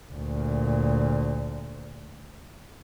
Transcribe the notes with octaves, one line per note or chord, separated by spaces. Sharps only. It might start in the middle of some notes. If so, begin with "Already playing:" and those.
D2 A#2